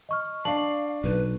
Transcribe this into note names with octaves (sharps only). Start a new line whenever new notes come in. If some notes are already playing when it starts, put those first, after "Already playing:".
D#5 C#6 F6
D4 F5 A5 C#6 F#7
B1 B4